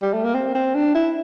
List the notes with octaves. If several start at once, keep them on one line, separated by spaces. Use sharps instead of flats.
G3
A3
A#3
C4
C4
D4
E4